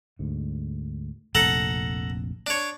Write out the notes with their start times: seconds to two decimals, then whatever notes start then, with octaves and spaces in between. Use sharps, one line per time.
0.19 D2 G#2
1.35 F1 A#1 C3 A4 F#5 A#5
2.47 D4 C#5